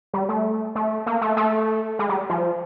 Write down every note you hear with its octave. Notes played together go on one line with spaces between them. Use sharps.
G3
A3
A3
A#3
A3
A3
G#3
G3
F3